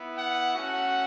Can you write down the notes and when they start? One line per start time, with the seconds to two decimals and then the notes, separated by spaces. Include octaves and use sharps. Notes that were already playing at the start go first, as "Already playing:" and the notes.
Already playing: B3 E4
0.16 F#5
0.55 A3 C#4 F#4 F#5